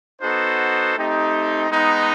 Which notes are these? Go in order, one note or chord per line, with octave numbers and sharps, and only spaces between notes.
B3 D#4 F#4 A4 C5
A3 C4 D#4 G4
G#3 B3 D#4